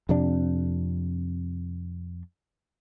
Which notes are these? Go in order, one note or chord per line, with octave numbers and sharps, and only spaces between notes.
F2 C3 D4